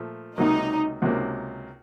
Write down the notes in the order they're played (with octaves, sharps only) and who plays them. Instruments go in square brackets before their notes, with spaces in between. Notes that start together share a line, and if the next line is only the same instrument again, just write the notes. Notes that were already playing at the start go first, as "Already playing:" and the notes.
Already playing: [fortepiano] A#2 F3 A3
[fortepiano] C#2 C3 F#3 A#3 [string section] D#4
[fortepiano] C#2 C3 F#3 A#3